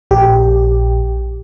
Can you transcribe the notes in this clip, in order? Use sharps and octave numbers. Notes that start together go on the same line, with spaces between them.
A#1 G4